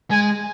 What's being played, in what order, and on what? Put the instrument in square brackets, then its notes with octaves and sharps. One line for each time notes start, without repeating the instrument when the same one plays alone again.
[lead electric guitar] G#3 [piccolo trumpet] G#5